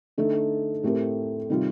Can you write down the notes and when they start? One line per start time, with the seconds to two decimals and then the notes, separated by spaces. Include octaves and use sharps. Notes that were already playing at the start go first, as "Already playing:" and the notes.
0.18 D3 A3 D#4 A4
0.83 A2 A3 C4 G4 A#4
1.50 C3 D#3 G3 C4 F4